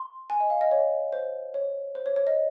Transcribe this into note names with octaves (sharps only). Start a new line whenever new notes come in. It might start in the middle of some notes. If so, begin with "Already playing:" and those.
Already playing: C6
G#5
D#5
F5
D#5
C#5
C5
C#5
C5
C#5
C#5
D#5